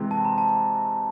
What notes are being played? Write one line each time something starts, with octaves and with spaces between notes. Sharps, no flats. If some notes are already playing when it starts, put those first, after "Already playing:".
Already playing: C3 E3 G#3 C4
A5
A#5
A5